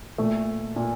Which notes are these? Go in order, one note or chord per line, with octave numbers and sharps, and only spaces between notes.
A#2 A3
A#2